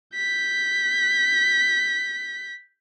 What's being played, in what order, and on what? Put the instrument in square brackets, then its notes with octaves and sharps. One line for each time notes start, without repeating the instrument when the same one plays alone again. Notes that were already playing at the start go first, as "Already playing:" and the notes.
[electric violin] G6 B6